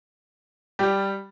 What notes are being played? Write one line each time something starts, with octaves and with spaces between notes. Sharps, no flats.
G3 G4